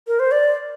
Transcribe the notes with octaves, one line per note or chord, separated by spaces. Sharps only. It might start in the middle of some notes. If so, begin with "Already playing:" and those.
A#4
C5
D5